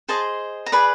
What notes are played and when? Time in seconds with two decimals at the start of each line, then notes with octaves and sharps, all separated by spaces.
0.08 G#4 C5 D#5 A5
0.66 A#5
0.72 G#4 B4 D5 B5